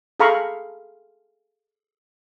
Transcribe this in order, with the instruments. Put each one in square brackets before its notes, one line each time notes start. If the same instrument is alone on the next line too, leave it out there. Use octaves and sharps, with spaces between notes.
[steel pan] G#4 A4 F5 A#5 B5 C#6